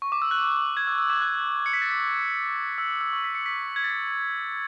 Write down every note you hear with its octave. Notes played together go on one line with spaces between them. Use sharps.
C#6
D6
E6
F#6
G#6
E6
E6
D6
F#6
C#7
B6
A6
B6
A6
E6
E6
C#6
B6
C#7
B6
G#6
A6
B6